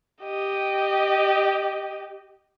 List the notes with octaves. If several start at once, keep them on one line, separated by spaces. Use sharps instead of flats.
G4 D#5